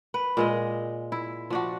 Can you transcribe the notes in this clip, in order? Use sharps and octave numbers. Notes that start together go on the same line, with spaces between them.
B4
A#2 G#3 D#5
E4
F3 D4 F#4